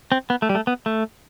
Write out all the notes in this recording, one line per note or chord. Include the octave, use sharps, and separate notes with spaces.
C4
B3
A3
G3
A3
B3
A3